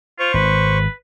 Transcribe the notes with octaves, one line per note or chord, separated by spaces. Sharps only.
F4 C5 C#6
G#1 B4